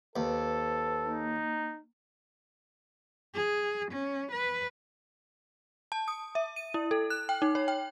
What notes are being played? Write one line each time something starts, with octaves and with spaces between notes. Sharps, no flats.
D#2 A4 B4 C5
A#3 D#4
G#4
C#4
B4
A5
D#6
E5
D#7
E4
A4
F#6
G5
D#4
C#5
G5